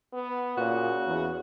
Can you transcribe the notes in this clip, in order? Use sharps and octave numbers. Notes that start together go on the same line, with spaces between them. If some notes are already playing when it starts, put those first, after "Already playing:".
B3
A#2 C#3 F#4
E2